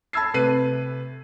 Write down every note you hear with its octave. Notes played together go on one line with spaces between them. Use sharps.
A5 B5 E6 G#6 C7
C3 A3 B4 C7 D#7